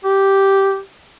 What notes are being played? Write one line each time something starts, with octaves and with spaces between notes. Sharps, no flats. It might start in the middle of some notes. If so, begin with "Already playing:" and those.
G4